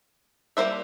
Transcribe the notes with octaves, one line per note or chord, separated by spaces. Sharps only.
G3 A#3 E4 C5 E5